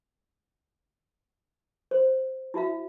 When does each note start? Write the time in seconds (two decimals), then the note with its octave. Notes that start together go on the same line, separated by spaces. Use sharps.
1.91 C5
2.54 E4 F#4 E5 F5